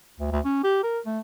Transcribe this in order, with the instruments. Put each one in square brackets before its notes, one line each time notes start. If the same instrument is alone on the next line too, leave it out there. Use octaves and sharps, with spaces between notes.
[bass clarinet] D2
D2
C#4
G4
A#4
A3